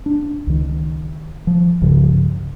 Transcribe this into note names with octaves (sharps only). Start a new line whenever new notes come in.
D4
C#2 D#3
F3
C2 G2 C#3 F3